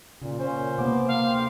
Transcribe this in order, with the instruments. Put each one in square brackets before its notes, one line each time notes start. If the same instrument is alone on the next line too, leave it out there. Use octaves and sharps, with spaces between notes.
[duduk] A#2 [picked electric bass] C#3
[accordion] A#2 C#4 [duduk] C5
[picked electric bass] C3 A#3 [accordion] B3 D6
[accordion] A#4 [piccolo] F5
[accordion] D2 G5 C6